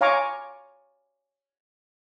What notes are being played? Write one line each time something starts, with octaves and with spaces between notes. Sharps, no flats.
C#5 F5 G#5 A#5 C#6 D6